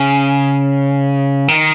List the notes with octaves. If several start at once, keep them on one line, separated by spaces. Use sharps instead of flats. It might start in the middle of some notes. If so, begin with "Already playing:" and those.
Already playing: C#3
D#3